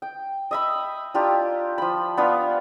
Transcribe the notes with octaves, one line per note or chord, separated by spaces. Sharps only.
G5
D#5 E5 B5
D4 F4 G4 A#5
F3 B5
B3 D4 F4 F5